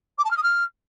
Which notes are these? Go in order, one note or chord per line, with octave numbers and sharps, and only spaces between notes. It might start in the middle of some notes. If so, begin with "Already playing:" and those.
D6
A5
F6
D#6
F6